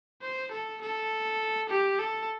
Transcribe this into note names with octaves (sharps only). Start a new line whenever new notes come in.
C5
A4
A4
G4
A4